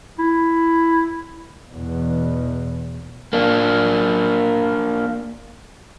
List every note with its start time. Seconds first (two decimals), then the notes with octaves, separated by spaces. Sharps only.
0.19 E4
1.69 E2 B2
3.33 A#3 D4